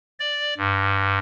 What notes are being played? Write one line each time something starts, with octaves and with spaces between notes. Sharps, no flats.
D5
G2